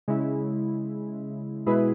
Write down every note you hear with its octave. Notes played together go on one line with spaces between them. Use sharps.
C#3 G#3 E4
B2 G#3 E4 G#4 B4